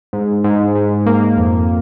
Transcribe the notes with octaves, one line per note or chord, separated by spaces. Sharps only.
G#2
G#2
G#2
A#3
F2